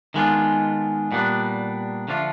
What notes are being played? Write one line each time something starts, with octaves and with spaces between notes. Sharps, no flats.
D#3 G#3 B3 D4 F4
A#2 G3 B3 D4
D3 F3 A3 D4 F4